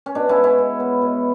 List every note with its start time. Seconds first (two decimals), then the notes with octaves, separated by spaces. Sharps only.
0.06 C#4
0.15 B2 D4
0.29 C#4 E4
0.36 G#3
0.44 C#4 E4
0.59 B2
0.80 B3
1.02 B2